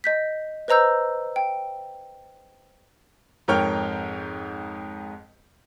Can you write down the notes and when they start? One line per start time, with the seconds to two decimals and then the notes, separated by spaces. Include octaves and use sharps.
0.04 D#5 G6 B6
0.68 B4 C5 D#5 A#5 E6 G6
1.36 G5
3.48 F2 G#2 A#4 C#5 G5 F6